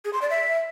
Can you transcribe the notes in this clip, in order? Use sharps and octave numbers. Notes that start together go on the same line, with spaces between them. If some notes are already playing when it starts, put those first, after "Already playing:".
G#4
C6
D5
E5